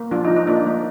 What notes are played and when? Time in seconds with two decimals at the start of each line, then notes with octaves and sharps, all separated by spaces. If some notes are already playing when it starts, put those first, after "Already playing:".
Already playing: A#3
0.11 F3 D4 F4
0.24 D#4
0.30 F3
0.36 D#4
0.47 A#3 D4
0.66 A#3